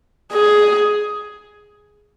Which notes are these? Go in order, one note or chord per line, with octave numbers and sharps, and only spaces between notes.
G#4